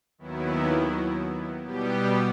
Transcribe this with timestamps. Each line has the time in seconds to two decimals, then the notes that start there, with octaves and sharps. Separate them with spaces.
0.18 D#2 D#3 F#3 B3 E4
1.63 B2 G3 B3 G4